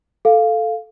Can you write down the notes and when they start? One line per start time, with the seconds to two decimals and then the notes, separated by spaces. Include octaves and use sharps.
0.25 A4 F5